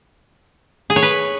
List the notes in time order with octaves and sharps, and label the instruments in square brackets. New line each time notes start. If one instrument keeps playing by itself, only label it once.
[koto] G#4
C#5
B4